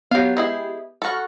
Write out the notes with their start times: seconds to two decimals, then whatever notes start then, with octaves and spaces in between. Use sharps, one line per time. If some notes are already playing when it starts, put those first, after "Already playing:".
0.11 F#3 B3 G4 F5
0.37 G#3 E4 G#4
1.02 F#4 A4 B5 C#6 F6